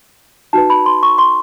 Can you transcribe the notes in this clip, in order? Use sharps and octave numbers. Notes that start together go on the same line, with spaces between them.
D#4 F#4 B4 A5
B5
C6
C#6
C6